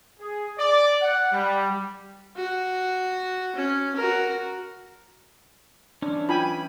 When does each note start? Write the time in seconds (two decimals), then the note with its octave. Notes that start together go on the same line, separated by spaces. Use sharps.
0.20 G#4
0.59 D5
1.02 F#5
1.32 G3
2.36 F#4
3.56 C#4
3.96 F#4 A#4
6.02 E3 C#4 D4
6.29 F4 G5 G#5 B5